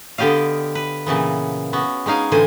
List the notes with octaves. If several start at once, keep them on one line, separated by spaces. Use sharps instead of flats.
D3 B3 G4 D#5 F5
B4
A#2 C#3 E3 B3
B3 C#4 F#4
G#3 C#4 D#4 F5 G#5
A2 D3 E3 C5 G#5